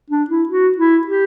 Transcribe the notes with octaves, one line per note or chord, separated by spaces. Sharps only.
D4
E4
F#4
E4
G4